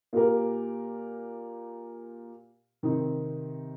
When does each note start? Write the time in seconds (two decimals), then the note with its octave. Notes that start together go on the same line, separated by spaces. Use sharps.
0.13 A#2 A#3 G4 A#4
2.83 C3 D#3 C4 D#4